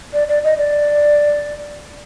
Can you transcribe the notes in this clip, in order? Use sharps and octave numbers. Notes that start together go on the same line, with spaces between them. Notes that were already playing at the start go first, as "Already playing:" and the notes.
D5
D5
D#5
D5